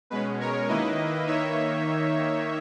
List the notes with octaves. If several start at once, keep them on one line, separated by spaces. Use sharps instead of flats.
B2 G#3 C#4 B4
A#4 C#5
D#3 A#3 E4 B4 D#5
D#3 A#3 D#4 C#5 E5